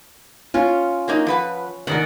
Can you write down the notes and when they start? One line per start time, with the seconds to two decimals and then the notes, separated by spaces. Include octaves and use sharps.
0.54 C#4 F4
1.08 F#3 A#3 D#4
1.27 F3 B4 F#5
1.87 G#2 D#3 A#4 D5 F#5